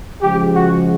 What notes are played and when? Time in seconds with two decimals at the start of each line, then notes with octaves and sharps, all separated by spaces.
0.22 C#3 F3 G#3 G4
0.56 F#4